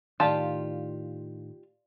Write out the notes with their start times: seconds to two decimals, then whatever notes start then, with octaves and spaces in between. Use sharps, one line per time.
0.20 A2 D#3 F4 G4 D5 F5 A5 C6